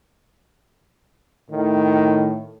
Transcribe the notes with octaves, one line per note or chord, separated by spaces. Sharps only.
A2 D#3